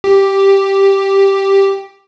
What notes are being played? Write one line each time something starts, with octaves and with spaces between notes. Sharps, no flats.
G4